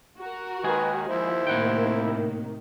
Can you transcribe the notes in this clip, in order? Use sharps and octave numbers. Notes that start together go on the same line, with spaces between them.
F#4 A#4
D#2 D#3 G#3 G#4 B4
D#2 F3 E4 C5
A2 C3 D#3 A#3 F#5 G5